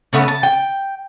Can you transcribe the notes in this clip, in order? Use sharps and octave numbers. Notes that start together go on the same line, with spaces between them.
C#3 A3 B3 C#4
A5
G5